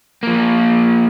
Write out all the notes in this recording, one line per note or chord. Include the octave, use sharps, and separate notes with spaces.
F3 A#3